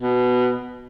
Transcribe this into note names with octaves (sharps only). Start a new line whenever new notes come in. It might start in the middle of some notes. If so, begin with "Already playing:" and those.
B2